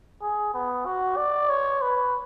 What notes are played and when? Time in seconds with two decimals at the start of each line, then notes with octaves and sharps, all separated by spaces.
0.22 G#4
0.54 B3
0.86 F#4
1.17 D5
1.50 C#5
1.82 B4